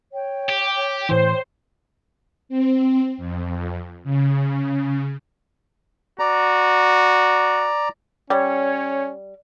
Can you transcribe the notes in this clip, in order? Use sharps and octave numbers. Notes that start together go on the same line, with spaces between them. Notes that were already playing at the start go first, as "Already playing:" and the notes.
C#5 G5
G4
A2 E3 C5
C4
F2
C#3
F#4 D5 A#5
G3 C#4 C#5